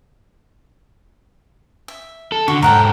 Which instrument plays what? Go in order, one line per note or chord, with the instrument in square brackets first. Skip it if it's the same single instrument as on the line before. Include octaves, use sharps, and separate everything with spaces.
[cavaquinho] E5
[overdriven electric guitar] A4
[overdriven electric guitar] D3 [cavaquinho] F#4
[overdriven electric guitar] G#2 A4 [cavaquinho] A#4 F#5 G5